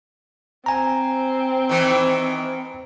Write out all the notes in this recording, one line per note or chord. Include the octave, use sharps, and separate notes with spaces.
C4 G#5 A#5
D#3 E3